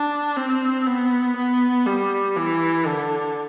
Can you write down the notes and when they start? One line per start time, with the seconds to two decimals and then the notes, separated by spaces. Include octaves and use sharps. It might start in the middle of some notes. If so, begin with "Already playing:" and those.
Already playing: D4
0.36 C4
0.87 B3
1.36 B3
1.87 G3
2.36 E3
2.86 D3